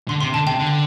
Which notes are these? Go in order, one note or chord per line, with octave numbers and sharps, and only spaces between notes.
D3 C6
C3 C6
D3 A5
C3 G5
D3